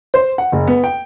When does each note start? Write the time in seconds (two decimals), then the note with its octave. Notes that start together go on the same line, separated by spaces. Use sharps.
0.14 C5
0.38 F#5
0.52 F#1
0.67 B3
0.84 G5